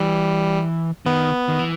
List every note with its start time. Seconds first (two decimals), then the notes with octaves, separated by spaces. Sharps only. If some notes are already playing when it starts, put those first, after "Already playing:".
Already playing: E3 G3
1.06 D#3 B3
1.49 D#3
1.59 E3